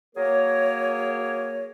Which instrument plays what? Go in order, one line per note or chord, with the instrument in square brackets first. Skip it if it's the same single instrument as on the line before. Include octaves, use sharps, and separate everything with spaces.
[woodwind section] F#3 A#3 G#4 A#4 C#5